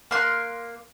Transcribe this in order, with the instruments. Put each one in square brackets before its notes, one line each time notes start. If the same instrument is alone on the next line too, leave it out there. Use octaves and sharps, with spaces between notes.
[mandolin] A#3 C6 F#6